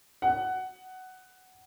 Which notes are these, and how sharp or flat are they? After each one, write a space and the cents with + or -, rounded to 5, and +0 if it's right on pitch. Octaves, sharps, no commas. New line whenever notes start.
F#5 +10